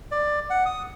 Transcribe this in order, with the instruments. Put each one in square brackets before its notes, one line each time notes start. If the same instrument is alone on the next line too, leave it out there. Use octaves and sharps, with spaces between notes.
[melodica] D5
F#5
D#6